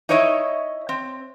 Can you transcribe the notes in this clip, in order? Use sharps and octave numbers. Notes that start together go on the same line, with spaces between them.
D#4 E4 C#5 D#5 E5
C4